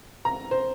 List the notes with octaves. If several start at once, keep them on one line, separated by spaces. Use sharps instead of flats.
A#5
C5